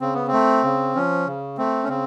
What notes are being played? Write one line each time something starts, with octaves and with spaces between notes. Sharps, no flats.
C#3 C4
B3
C4
A3
C#3
F3 C#4
C#3
A3 C4
C#4
C#3 C4